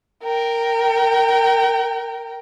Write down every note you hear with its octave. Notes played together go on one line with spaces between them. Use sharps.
A#4 G5